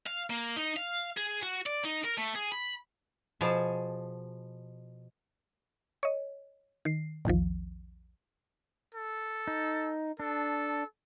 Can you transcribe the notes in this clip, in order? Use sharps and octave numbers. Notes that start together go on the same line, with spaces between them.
F5
A#3
D#4
F5
G#4
F#4
D5
D#4
A#4
A3
G#4
B5
B2 F3 G#4 G#5 A5
C#5 D#5
D#3 C7
A#1 E2 D#3 F3
A4
D#4
D4 A4